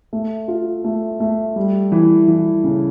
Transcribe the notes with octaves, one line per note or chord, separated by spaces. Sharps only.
A3
F4
A3
A3
G3
E3
E3
C#3